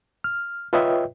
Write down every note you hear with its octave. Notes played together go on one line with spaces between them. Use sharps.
F6
F4 B4 C#5 D#5 E5 G5